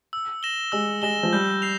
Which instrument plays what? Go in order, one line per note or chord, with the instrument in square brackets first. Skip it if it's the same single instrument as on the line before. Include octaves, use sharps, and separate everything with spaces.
[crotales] E6
A#6 E7 G7
[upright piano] G#3 [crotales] E6
[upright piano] G#3 [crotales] A#6 E7 G7
[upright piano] F3
[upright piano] G3 [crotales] G6
[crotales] C7 F7